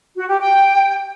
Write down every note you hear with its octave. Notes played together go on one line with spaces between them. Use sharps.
F#4
G4
G5